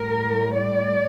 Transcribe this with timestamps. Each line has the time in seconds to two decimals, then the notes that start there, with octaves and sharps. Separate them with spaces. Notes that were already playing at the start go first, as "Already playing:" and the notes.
Already playing: A2 G3 A#4
0.54 D5